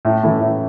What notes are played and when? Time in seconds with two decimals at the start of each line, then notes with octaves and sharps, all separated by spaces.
0.05 A2
0.23 E3 A3 E4
0.41 A2